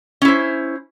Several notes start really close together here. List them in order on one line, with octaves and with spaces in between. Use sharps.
C#4 E4 C5